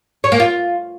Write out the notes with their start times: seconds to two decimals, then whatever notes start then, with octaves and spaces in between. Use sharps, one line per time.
0.24 C#5
0.32 A#3
0.40 F4